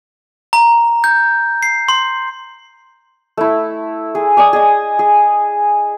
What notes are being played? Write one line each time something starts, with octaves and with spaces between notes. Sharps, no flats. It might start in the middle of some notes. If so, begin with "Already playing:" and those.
A#5
G6
C7
C6
A3 E4
G#4
D5 G#5 A5 D#6
G#4 D#5 D#6
G#4